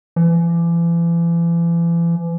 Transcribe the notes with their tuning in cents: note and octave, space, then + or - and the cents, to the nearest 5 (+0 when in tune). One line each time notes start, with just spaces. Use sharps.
E3 +40